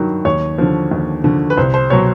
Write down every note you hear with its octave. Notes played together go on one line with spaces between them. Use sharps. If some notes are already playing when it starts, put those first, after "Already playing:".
Already playing: G2 D#3 F#3
D#2 C#5
D3 F3
D#2
D3 F3
B4
C2 C5
C5
B2 F#3 C#5